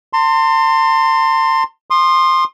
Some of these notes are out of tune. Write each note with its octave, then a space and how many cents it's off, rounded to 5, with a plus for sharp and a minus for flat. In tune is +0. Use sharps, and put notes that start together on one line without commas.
A5 +45 C6 +0
C6 +10 D#6 -35